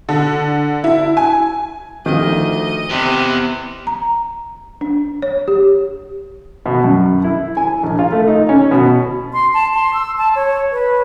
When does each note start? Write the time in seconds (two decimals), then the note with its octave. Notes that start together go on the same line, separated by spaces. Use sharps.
0.09 D3
0.84 E4
1.17 G#5
2.06 D2 D#3 F3 D#5
2.90 E2 C3 B3
3.87 A#5
4.81 D4
5.22 C#5
5.48 G4
6.66 B2
6.84 F#2
7.24 E4
7.57 G#5
7.83 A#1
7.99 F4
8.12 A3
8.28 D#4
8.49 C#4
8.71 B2
9.33 C6
9.54 A5
9.74 C6
9.94 E6
10.18 A5
10.36 C#5
10.72 B4